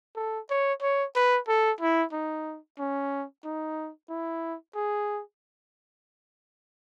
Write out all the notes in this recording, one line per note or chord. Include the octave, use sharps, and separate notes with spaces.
A4
C#5
C#5
B4
A4
E4
D#4
C#4
D#4
E4
G#4